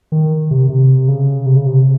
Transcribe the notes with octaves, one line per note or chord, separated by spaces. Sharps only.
D#3
C3
C3
C#3
C3
C#3
C3